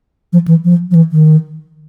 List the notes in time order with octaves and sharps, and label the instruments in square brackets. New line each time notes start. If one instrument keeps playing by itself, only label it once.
[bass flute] F3
E3
F3
F3
E3
D#3